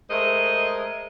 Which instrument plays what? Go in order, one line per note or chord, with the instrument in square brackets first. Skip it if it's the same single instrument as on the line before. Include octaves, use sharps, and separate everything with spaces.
[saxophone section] G#3 A3 A#4 C5 D#5